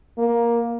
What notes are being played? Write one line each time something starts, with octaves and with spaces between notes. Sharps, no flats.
A#3